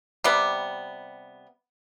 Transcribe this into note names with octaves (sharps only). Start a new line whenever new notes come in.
C3 G3 B3